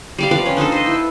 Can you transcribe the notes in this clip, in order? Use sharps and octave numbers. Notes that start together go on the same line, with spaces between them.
G3 D5 F5
F3 B4 D5 F5
C#4
D4 D#4 F4 A4
C5 D#5
E4 B4